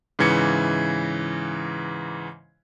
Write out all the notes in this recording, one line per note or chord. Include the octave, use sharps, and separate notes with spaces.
G#2 C#3 E3 G#6 C#7